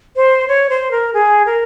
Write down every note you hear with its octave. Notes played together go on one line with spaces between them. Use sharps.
C5
C#5
C5
A#4
G#4
A#4